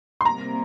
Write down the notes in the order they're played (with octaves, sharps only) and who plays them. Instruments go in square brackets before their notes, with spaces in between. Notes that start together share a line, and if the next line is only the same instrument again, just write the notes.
[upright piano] C6
[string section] C3 G3 A#3 [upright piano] A#5